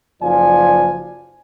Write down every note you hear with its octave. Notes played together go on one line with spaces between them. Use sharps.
F#1 F3 F4 D5 G#5